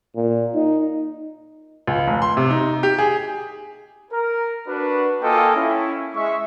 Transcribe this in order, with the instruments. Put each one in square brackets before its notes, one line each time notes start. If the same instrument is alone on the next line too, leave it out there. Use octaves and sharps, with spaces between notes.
[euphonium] A#2
D#4
[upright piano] C#2
F1
C6
C3
D#4
G4
G#4
[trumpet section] A#4
D4 F#4 B4
A#3 F4 A4 D#5 G5 G#5
C#4 E4
G#3 E5 C#6